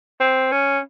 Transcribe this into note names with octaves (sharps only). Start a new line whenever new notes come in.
C4
C#4